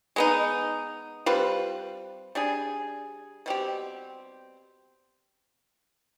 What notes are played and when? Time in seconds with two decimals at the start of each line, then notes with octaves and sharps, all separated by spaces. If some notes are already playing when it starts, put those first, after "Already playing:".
0.16 G#3 B3 D#4
1.26 G3 C4 F4 B4
2.35 G3 D4 G#4
3.46 B2 G3 C4 G4